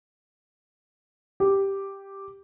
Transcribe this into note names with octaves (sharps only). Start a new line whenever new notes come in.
G4